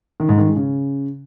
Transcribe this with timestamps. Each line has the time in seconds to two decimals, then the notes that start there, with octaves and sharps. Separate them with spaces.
0.20 D#3
0.29 G#2
0.38 D#3
0.47 G#3
0.56 C#3